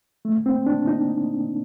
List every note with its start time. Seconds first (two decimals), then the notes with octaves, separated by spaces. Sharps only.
0.25 A3
0.46 C4
0.66 D4
0.87 D#4